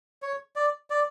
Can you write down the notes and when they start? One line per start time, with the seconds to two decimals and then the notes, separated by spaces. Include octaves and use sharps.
0.22 C#5
0.56 D5
0.90 D5